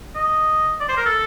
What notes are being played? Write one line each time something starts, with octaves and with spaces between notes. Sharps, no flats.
D#5
D5
C5
A#4
A4